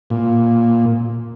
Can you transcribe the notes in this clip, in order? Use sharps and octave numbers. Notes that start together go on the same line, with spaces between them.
A#2